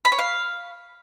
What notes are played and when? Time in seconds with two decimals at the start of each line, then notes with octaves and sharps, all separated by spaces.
0.05 B5
0.12 C#5
0.19 F5